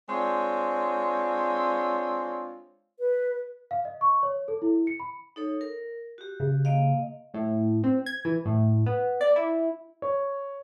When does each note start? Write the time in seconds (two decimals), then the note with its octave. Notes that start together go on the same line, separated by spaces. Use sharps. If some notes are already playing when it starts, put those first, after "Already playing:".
0.09 G#3 C4 D4 F4 C#5
2.99 B4
3.71 F5
3.85 D#5
4.01 C#6
4.23 C#5
4.48 A4
4.62 E4
4.87 C#7
5.00 B5
5.36 D#4 A4 C#5
5.61 A#4
6.18 F#4 G4
6.40 C#3
6.65 A#3 D#5 F5
7.34 A2
7.84 C4
8.06 G#6
8.25 E3
8.45 A2
8.86 B3
9.21 D5
9.36 E4
10.02 C#5